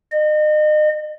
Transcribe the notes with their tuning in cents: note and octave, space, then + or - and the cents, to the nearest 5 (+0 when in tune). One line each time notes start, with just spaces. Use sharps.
D#5 -35